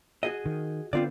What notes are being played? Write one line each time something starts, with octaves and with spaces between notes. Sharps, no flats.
F#4 G#4 D#5
D#3
D3 B3 C4 F4 D5